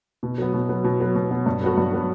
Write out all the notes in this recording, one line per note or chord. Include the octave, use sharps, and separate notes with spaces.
B2
F#3 B3
B2
F#3 B3
B2
F#3 B3
B2
F#3 B3
G2
F#3 B3 F#4
G2
F#3 B3 F#4